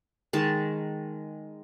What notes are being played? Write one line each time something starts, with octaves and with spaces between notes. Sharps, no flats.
D#3 G#3 A5